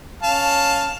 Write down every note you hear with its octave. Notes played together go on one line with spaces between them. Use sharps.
C#4 F5 A5